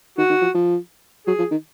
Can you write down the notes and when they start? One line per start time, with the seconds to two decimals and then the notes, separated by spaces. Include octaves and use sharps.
0.18 D#3 F#4
0.30 D#3
0.41 F3
0.54 F3
1.27 F#3 G#4
1.39 F3
1.51 D#3